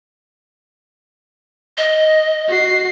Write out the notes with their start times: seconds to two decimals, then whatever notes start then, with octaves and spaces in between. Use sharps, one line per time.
1.78 D#5
2.48 F#4 C7